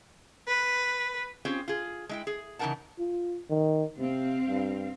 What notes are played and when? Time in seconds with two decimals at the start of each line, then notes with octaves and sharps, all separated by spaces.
0.48 B4
1.45 C4 C#4 F4 G4 G#4
1.68 F4 G#4
2.09 G#3 E4 G5
2.27 G#4
2.59 C#3 E3 D#4 A#4 F#5 A5
2.99 F4
3.50 D#3
3.98 C3 C4 F5
4.48 G2